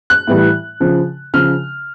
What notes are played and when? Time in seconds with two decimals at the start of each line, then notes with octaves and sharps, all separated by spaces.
0.10 F#6
0.27 A2 E3 G3
0.80 C#3 F3
1.34 C#3 F3 F6